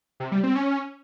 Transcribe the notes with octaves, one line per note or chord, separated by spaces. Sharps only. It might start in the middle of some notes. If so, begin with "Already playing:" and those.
C3
G3
C4
C#4